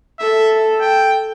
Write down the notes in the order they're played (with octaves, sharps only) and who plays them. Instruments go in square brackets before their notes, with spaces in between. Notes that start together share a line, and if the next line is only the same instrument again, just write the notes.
[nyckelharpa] A4 [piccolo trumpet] E5
[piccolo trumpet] G5